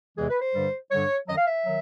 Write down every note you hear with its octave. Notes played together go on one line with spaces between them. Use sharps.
E2 C3 E3 G#3 G#4
B4
C5
G2 D3 G3
G2 D3 G3 C#5
F#2 D#3 F#3 D#5
F5
E5
D#3 F#3